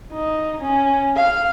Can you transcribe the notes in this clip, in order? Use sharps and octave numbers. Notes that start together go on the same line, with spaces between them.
D#4
C#4
F5